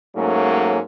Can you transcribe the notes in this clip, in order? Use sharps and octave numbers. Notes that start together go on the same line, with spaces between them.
G#2 F#3 A3 A#3 C#4